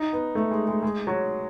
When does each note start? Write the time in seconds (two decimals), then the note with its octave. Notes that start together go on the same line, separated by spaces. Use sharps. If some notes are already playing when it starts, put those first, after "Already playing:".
Already playing: D#4
0.12 B3
0.35 A3
0.51 G#3
0.68 G#3
0.82 G#3
1.07 F#3